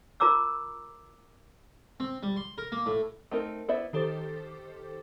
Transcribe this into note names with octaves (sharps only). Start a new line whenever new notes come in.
F4 A#4 A#5 D6 E6
C4
G3
C6
A#4
A#3
A2
A3 C4 D#4 A#4
B3 E4 C5 D5 E5
D#3 G4 A4 C5 D6 A6